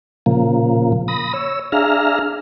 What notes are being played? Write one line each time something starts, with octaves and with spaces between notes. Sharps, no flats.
A#2 C#3 F3 A#3
B5 D#6 A#6
C#5 E6
D4 G#4 E5 F5 A#5 F6